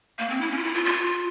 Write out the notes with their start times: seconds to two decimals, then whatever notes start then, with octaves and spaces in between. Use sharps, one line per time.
0.19 A#3
0.29 C4
0.41 E4
0.51 C#4
0.57 F4
0.63 E4
0.74 F4
0.85 F4